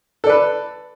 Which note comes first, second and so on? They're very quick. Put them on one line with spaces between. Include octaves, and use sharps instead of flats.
A4 D5 B4